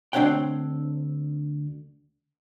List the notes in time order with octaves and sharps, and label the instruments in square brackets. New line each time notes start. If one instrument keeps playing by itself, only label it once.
[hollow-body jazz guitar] D2 C4 D4 C#5 F#5 G5